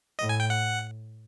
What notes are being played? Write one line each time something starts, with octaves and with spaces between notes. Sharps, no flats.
A2 D#5
G#5
G5
F#5